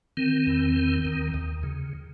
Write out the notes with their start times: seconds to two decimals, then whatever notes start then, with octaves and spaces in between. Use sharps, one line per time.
0.17 D#3 C4
0.47 E2
0.76 D#3
1.05 D#2
1.34 D#2
1.63 C#3